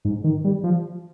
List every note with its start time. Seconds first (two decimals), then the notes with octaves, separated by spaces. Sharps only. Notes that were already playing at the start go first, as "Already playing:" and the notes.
0.05 G#2
0.24 D#3
0.44 G3
0.64 F3